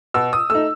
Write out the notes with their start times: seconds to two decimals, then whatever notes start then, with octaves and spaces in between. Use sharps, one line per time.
0.14 B2 E6
0.33 D#6
0.50 A3 D#4 E6